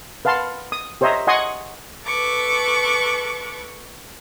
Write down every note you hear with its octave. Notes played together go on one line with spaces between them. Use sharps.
B4 F5 F#5 A5 C6
D#6
G4 C5 C#5 D#5 E5 A#5
D#5 F#5 G#5 C6 C#6 D#6
A4 B4 C#6 D6